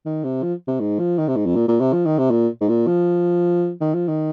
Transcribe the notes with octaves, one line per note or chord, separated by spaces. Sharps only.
D#3
C3
F3
C3
G#2
F3
D#3
C3
G#2
F2
A#2
A#2
C3
F3
D#3
C3
A#2
G#2
A#2
F3
D#3
F3
D#3